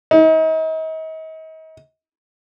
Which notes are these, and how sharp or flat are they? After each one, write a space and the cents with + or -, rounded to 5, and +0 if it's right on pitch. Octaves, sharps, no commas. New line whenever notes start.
D#4 +40